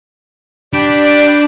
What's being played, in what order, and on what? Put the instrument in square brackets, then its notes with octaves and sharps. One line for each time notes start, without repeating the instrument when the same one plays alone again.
[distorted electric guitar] D4 [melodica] G4 B5 [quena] D5 [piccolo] D7